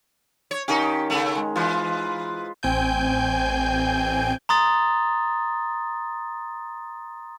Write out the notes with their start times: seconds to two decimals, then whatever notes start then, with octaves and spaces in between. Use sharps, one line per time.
0.51 C#5
0.68 D#3 C#4 D#4 G4 F5
1.10 C#3 A3
1.35 G#3
1.56 E3 F4 B4 C5
2.63 A1 C4 G5 G#5 G6
4.49 A#5 C6 D#6 A6